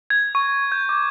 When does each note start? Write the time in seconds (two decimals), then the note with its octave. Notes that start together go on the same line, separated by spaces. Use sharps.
0.10 G#6
0.35 C#6
0.72 G6
0.89 D6